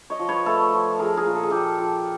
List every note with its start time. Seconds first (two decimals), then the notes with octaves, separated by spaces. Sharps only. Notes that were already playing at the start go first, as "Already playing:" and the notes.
0.10 C#5 D#5
0.19 F3
0.29 B4 C#5
0.46 A3 A4 B4
0.73 F3
0.99 F3 G#4 A#4
1.17 G#4 A#4
1.26 A#2
1.35 A4
1.43 G#4
1.50 A#2 G4 A4
1.80 F3